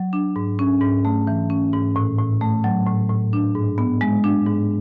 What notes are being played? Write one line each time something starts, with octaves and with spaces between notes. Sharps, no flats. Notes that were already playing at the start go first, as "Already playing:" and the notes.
Already playing: F#3
D4
G#2
C#4
G#2
A3
E3
C#4
G#2
A2
A2
A3
F#3
A2
A2
D4
G#2
B3
G#3
D4
G#2